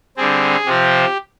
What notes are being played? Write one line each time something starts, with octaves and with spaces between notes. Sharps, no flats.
D3 G3 C4 G#4
C3 F3 C4 G4